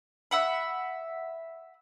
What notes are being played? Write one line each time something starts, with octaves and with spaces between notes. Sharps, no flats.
E5 F#5 B5